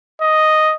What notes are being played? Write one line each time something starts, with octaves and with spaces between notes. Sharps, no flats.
D#5